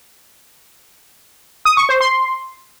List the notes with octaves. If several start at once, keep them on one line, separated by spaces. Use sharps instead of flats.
D#6
C#6
C5
C6